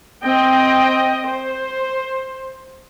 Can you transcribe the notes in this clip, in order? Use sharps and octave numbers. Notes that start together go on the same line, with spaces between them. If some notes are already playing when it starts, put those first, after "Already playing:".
C4 D#5 G5
C5